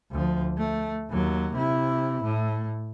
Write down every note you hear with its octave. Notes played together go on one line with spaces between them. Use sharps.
D2 F3
A3
D#2 F#3
C3 E4
A2